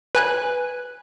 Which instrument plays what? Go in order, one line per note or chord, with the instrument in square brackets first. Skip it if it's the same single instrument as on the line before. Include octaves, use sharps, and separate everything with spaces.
[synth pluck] B4 G#5 F#6